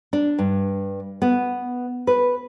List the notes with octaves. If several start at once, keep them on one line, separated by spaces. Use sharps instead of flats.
D4
G2
B3
B4